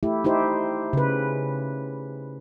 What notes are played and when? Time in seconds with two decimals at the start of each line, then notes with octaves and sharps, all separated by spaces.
0.03 A3 E4 G4
0.24 D#4 E4 G4 C5
0.93 C#3 B4